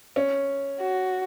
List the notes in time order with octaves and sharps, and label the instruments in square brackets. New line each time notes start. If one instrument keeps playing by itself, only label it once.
[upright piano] C#4
[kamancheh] F#4